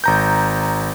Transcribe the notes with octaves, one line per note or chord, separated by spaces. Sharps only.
G#1 A#5 G6